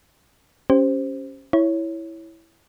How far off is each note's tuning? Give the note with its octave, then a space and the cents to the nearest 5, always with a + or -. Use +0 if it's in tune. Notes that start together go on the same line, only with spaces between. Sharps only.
C#4 +0 G4 +0 C5 +0
E4 +0 C#5 +0